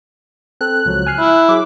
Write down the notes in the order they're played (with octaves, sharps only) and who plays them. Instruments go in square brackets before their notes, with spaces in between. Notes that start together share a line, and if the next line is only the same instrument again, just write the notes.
[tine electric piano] C4 A4 [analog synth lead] F#6
[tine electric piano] C#2 F3 F#3
G#5 F6 C7
[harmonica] E4
[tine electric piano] F#3 G#4 [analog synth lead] D6